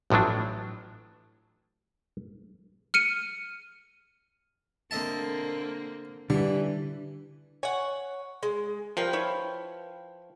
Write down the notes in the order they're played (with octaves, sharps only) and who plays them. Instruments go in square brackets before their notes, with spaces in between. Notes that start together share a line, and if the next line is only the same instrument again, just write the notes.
[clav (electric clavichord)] A1 A2 F3 F#3 D4
[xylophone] F6 C#7 D#7
[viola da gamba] D3 A#3 C4 [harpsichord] D#5 E5 A5
[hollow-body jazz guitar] D3 [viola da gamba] E3 [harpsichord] G3
[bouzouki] C#5 F#5 [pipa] G#5
[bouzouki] G#3
[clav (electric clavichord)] F3 [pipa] G3 A#4 [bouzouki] B4 F5 G5
[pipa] E4 C#5 B5